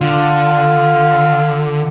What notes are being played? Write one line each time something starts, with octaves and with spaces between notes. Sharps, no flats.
D3 F4